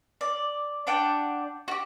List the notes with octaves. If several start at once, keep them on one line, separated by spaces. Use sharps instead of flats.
D5
D4 D5 F#5 G5
F#4 G4